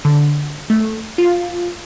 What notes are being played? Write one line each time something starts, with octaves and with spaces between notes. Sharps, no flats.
D3
A3
F4